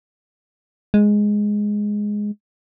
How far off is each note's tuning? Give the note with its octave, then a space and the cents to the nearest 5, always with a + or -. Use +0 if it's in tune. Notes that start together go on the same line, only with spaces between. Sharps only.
G#3 +0